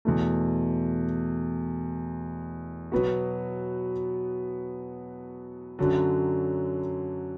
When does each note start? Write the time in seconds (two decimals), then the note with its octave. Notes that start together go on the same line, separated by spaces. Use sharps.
0.05 E2 B2 A3
2.92 B2 F#3 B3 F#4
5.79 F#2 D3 F#3